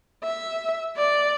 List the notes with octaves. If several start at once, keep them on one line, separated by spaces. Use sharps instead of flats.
E5
D5